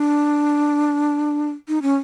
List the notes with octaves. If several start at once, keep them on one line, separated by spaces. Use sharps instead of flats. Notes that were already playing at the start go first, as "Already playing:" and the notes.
Already playing: D4
D#4
C#4